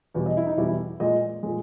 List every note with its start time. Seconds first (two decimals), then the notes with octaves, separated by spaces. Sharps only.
0.14 E2 B2 G3
0.26 D#5
0.37 E4
0.47 D#4
0.57 E2 B2 G3 E4
0.68 E4
1.00 A#2 G#3 D#5
1.43 A#2 G#3